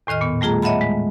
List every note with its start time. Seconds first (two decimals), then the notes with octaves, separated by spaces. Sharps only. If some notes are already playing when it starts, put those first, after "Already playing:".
0.07 E2 A2 D#3 D#5 F6
0.21 A#2 B3
0.41 G3 A3 F4 G#4 A#5
0.62 C#5 D#5 E5 F#5 A5 B5
0.81 G#3